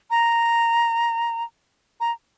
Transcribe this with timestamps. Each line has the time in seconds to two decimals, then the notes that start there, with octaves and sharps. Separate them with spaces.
0.10 A#5
2.00 A#5